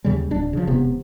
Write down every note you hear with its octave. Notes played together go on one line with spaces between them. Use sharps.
D#2 C#3 F#3 G3
D1 D4
C#3 F3
E1 C3 B3